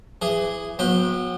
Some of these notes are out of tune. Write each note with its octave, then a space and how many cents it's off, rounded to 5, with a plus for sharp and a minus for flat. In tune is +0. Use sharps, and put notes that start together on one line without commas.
E3 +25 G#4 -10
F#3 -30 B3 -30 G5 +0